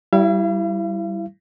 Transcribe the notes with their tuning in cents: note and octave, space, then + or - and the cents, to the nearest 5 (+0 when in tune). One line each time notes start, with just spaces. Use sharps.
G3 -20 E4 +5 F5 -45